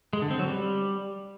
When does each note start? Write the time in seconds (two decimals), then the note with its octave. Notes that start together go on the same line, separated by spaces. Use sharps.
0.13 G#3
0.22 D3
0.31 C4
0.39 F#3
0.48 G3